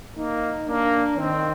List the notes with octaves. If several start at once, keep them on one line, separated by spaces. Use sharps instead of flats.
A#3 D#4
A#3 D4
D#3 C4